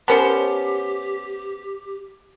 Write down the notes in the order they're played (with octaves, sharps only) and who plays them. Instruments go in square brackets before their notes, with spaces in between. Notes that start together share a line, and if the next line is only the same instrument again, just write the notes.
[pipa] B3 C#4 C5 [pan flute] G4 [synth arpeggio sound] A#4 A5